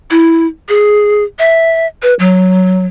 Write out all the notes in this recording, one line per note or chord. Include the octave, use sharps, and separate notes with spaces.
E4
G#4
E5
B4
F#3